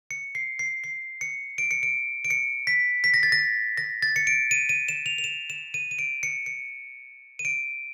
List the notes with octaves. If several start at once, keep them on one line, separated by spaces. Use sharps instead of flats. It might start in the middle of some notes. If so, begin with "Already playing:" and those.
C#7
C7
C7
C7
C#7
D7
C#7
D7
D7
C#7
B6
B6
A#6
A6
A#6
A#6
A6
C#7
D7
D#7
D#7
E7
F7
F7
E7
E7
D#7
D#7
D7
C#7
C#7
D#7
D7